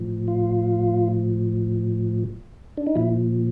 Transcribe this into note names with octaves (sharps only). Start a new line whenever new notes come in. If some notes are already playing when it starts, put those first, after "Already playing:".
Already playing: A2 F3
F4
D4
D#4
A#2 F3 E4